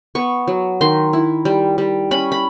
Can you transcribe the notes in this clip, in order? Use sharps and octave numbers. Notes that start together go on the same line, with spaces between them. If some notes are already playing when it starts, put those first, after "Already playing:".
B3 C#6
F#3
D#3 C6
E4
G3
G3
C#4 B5
B5